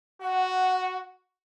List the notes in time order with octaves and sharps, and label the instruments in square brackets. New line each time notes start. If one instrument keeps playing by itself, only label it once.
[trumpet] F#4 [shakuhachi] F#5